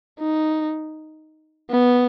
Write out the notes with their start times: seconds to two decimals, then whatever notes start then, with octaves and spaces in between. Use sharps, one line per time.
0.20 D#4
1.71 B3